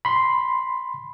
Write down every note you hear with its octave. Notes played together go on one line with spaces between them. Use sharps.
B5 C6